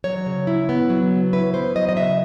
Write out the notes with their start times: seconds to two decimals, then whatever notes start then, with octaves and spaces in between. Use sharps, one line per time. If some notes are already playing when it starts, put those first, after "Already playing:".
0.04 F#3 C#5
0.26 C#3
0.47 E4
0.69 B3
0.90 F#3
1.11 C#3
1.33 E4 B4
1.54 B3 C5
1.76 F#3 D#5
1.89 D#5
1.97 C#3 E5